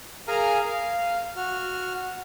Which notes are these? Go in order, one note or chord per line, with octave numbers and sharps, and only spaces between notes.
G#4 A#4 F5 G#5 A#5 F6
F5
F#4 F6